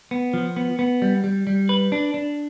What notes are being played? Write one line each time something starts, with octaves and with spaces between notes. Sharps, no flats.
B3
F3
B3
B3
G3
G3
G3
B4
D4
D4